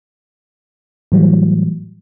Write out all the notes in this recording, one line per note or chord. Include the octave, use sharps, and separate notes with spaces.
A2 E3 F#3 G3